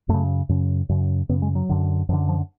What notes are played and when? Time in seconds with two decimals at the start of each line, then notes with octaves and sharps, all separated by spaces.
0.09 F#2 C#3 A3
0.49 F#2 C#3
0.89 F#2 C#3
1.29 F#2 C#3 B3
1.42 G#3
1.55 F#3
1.69 F#2 D3
2.09 F#2 F3
2.13 D3
2.28 F3